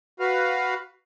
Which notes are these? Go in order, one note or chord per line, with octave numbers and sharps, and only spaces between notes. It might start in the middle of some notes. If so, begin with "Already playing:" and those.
F#4 B4 F5